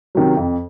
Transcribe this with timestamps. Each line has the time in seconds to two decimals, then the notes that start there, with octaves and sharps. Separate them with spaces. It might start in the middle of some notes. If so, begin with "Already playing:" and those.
0.15 C3 D#3 F#3
0.37 F2